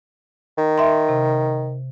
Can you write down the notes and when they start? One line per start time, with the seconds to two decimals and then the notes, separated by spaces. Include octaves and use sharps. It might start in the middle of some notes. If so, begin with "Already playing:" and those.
0.58 D#3
0.78 E5 C6
1.09 C3